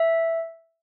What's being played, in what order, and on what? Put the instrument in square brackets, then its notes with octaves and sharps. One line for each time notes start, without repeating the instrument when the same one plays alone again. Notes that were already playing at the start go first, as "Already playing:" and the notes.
Already playing: [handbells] E5